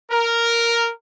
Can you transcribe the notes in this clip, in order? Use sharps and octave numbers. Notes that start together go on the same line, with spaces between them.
A#4